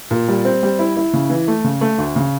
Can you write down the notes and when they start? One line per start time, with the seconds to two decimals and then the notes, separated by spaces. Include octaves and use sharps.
0.11 A#2
0.28 G3
0.45 C4
0.63 G3
0.79 E4
0.97 E4
1.13 C#3
1.30 E3
1.48 A3
1.64 C#3
1.81 A3
1.98 D2
2.16 C#3